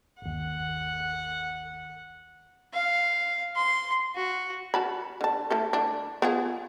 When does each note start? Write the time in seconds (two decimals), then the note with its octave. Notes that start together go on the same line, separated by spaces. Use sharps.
0.22 G1 D#2 F#5
2.73 F5
3.56 C6
4.16 F#4
4.74 F#4 A5 B5
5.21 D3 A5
5.50 A3 E4 A4
5.73 D3 D4
6.22 B3 F4 G#4